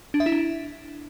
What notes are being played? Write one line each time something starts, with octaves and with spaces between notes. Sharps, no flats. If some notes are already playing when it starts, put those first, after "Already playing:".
D4
E5
E4
D4